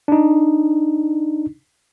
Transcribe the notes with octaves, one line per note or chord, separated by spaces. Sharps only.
D4 D#4